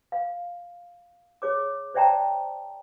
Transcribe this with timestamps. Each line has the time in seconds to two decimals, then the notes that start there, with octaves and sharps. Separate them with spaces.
0.12 F5
1.42 G#4 C#5 D6
1.94 C5 D5 E5 G5 A5 A#5